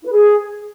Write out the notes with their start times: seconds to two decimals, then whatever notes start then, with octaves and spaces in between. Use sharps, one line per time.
0.01 E4
0.06 B4
0.11 G#4